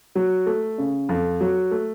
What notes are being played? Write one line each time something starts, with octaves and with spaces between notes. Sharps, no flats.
F#3
A3
C#3
F2
F#3
A3